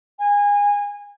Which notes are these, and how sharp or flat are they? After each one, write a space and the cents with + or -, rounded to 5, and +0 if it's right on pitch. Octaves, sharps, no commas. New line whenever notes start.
G#5 -25